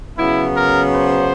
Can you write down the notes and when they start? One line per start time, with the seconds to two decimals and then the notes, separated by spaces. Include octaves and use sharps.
0.18 C#3 F#3 B3 E4
0.56 A#4
0.95 C5